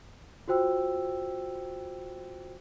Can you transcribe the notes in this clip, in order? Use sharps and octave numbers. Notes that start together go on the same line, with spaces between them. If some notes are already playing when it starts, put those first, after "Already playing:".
F4 F#4 C5 G5 E6